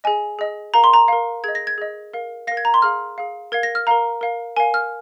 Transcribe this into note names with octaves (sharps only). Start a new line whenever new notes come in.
G#4 D#5 G#5
G#4 D#5
A#4 F5 A#5
C6
A#5
A#4 F5
G#4 D#5 G#6
A#6
G#6
G#4 D#5
A#4 F5
A#4 F5 A#6
G#6
A#5
C6
G#4 F5 F6
G#4 F5
A#4 F5 G#6
A#6
F6
A#4 F5 A#5
A#4 F5
A#4 F5 G#5
F6